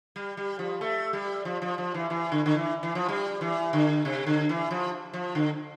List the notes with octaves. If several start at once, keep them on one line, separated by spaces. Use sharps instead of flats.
G3
G3
F3
A3
G3
F3
F3
F3
E3
E3
D3
D3
E3
E3
F3
G3
E3
D3
C3
D3
E3
F3
F3
D3